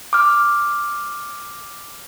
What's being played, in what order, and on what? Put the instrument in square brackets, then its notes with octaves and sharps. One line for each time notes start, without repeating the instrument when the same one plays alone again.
[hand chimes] D6 F6